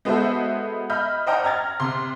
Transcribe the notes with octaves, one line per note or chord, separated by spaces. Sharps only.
G#3 B3 F#4 A4 C5 E5
D#5 E5 B5 F6 G6
C5 D5 D#5 F#5 G5 A#5
A#5 F6 G#6 A6
C3 C6